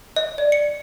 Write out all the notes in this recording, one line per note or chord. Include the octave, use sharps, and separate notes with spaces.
D#5
D5
C#7